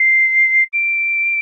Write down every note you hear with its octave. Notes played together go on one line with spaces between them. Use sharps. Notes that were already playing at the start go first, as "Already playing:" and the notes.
Already playing: C7
D7